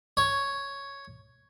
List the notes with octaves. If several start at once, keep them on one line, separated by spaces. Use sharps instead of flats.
C#5